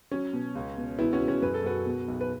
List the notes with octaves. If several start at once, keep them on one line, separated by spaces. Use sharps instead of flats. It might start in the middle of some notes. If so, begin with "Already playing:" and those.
F#3 C#4
B2
C#2
B2
E1 B3 E4
C#4 F#4
E1
C#4 F#4
F#2 B4
A4
F#2 F#4 B4
B2
B1
B4